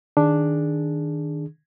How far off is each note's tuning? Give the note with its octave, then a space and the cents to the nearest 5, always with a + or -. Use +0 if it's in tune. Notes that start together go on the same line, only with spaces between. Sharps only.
D#3 +0 D4 +0 G#4 +0